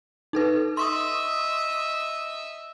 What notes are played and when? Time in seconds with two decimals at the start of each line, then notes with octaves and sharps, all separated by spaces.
0.33 D#4 A4 B4
0.77 D#5 E5 C6 C#6 D#6